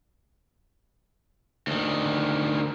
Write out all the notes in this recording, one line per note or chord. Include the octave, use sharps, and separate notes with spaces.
D2 D#3